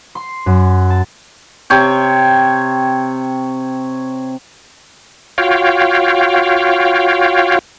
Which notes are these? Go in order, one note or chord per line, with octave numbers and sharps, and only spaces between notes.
C6
F#2
A5
C3 C#5 G5
F4 F#4 C#5 F5 G5